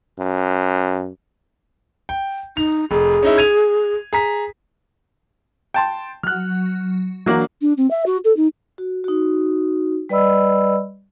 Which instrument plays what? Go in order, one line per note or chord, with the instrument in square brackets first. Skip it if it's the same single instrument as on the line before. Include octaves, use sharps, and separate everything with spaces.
[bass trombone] F#2
[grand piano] G5
[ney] D#4 [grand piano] F7
[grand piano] F1 [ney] G#4
[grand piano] C#4 D#4 E4
G#6 D#7 F7
G#4 A#5 B6
[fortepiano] G5 A5 C6
[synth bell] F#3 [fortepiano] F6 F#6
[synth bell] E3 D4 F#5 [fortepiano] F#3 A#3
[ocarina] D4
C4
E5
F#4
A4
D#4
[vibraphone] F#4
D#4 F#4
G3 B4 D5 D#5 B5 E6